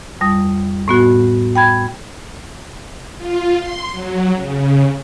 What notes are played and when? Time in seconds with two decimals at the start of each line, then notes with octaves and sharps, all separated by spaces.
0.21 F2 G3 D#6
0.88 A2 B3 F#4
1.56 G5 B5 G#6
3.18 F4
3.55 C6
3.91 F#3
4.35 C#3